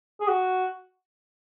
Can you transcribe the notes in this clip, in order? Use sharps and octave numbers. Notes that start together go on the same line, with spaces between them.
G#4
F#4